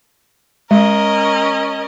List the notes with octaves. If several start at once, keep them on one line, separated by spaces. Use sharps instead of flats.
G#3 C#4 A#4 D#5